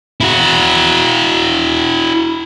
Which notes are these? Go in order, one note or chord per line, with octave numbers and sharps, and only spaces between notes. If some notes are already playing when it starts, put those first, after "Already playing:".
E4 F#4